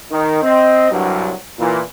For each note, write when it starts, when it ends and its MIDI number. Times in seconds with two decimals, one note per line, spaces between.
0.11 0.41 51
0.43 0.91 60
0.43 0.91 75
0.91 1.33 36
0.91 1.33 43
0.91 1.33 54
1.60 1.81 46
1.60 1.81 52